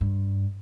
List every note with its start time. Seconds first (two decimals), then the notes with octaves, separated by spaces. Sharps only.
0.01 G2